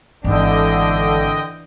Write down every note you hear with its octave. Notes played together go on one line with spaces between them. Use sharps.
G#1 D3 E3 D4 D#5 G5